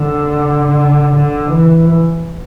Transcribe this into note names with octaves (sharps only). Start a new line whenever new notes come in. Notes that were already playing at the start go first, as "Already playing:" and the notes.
Already playing: D3
D3
E3